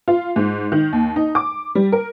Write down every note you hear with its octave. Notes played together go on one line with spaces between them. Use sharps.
F4
G#2
D#3
D#2
D#4
D6
G3
A#4